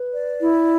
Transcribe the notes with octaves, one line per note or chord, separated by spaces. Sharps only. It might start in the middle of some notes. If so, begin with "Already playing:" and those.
Already playing: B4
D5
E4